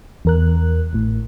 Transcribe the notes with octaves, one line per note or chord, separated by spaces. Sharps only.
E2 A#4 F#6
A1 A2